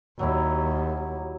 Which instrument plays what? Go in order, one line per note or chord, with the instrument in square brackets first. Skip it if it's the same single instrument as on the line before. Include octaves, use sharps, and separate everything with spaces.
[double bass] D#2 [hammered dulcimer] F#3 G3 E4